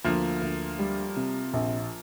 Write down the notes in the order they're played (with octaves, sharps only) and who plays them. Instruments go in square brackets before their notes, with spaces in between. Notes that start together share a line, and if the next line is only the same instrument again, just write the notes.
[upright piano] D2 [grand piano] F3 A#3
[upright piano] D2
G3
C3
A#1